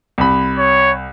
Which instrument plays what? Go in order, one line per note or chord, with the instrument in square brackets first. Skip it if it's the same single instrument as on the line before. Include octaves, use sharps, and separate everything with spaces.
[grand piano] C2 B5
[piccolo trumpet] C#5